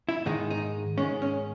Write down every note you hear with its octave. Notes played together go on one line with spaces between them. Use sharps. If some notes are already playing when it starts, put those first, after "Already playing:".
E4
G#2 D#3 G#3 D#4
D#4
G#2 D#3 G#3 C#4
C#4